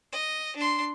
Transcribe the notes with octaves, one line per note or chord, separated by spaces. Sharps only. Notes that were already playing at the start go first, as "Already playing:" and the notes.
D#5
D4 C6